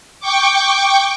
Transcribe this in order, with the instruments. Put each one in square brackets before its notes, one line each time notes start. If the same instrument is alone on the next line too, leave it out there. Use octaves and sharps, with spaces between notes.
[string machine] G5 C#6 D6